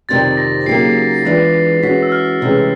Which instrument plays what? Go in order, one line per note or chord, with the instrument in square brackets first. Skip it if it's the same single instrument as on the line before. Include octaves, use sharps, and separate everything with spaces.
[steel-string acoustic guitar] F2 C3 D#3 G3 C4 [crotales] A6
[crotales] A#6
[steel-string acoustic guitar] C#3 F#3 A#3 D#4 G4 [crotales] C7
[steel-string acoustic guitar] E3 G#3 B3 D4 F4
[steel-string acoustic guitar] E3 G#3 C#4 F#4 [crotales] B6
[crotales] E6
F6
[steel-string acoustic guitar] D2 C3 E3 G#3 C#4